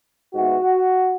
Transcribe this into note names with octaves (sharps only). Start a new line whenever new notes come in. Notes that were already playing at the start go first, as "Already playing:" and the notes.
G#2 E3 B3 F#4